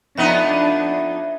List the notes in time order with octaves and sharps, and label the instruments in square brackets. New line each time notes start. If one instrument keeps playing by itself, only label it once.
[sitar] F2 B3 D#4 [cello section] D4 [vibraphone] E5